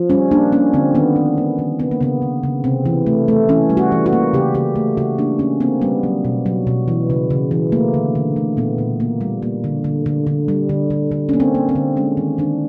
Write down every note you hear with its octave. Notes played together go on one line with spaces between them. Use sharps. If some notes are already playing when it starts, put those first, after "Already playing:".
Already playing: F3
G3 C#4
A#3 D4
A#3 C#4
D3 C4
D#3 B3
D#3
A#3
D#3
C#3 B3
A#3
C#3 B3
C#3
C#3
C3 C4
E3
A3
A3
E3 C#4
G3
F#4
E3
F#4
A#3
C#3 G4
C#3 G4
A3
C#3 F#4
A#3 D4
A#3 C#4
A#3 C4
G3 B3
F#3
B2
F#3
B2
E3
C#3
C#3
E3
A3 A#3
D3
D3
A3
A#2 B3
A#2
A#3
G3
A#3
D3
D3
D3
D3
G3
D3
D3
D3
A#3 C#4
C4
A#3
C4
D3
G#3 C#4
D#3
D#3 D4